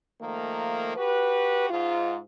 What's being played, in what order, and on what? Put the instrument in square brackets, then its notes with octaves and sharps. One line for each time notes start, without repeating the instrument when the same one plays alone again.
[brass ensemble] D#3 F3 A3 A#3
F#4 G4 B4
G#2 F4